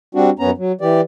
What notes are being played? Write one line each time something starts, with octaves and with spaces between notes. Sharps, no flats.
G3 C4 D4 F#4
F#2 B3 C#4 A#5
F#3
E3 G4 D5